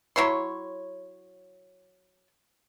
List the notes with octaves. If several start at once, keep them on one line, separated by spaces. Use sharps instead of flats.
F#3 E4 C#5 C6